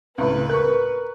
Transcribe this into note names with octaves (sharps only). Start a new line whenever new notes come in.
C#2 A2 B4
A#4 C#6 F#6